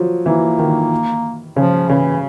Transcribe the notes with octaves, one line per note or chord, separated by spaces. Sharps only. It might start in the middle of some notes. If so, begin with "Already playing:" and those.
Already playing: F3 F#3
E3 A#3
D#3
C#3 F3
C#3 E3